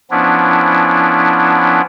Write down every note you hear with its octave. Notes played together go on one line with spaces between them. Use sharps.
F3 B3 C#4 D4 E4